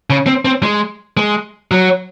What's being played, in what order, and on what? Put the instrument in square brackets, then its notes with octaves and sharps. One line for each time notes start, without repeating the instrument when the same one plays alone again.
[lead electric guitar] C#3
C4
C4
G#3
G#3
F#3